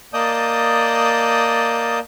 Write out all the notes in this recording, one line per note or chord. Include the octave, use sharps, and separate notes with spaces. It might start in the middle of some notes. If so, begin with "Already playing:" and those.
A#3 D5 D#5 A5 D#6 G6